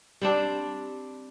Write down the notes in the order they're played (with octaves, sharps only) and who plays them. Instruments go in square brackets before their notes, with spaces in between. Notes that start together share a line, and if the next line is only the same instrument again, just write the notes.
[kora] G3 C4 D4